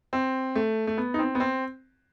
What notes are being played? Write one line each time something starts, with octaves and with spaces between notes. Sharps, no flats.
C4
A3
A3
B3
D#4
C4
B3
C4